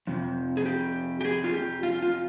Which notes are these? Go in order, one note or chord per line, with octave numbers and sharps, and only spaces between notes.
F2 C3 F3
G#4
G4
G4
G#4
F4
G4
F4
F4